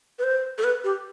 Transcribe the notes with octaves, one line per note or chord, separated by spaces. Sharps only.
B4
C5
A4
B4
G4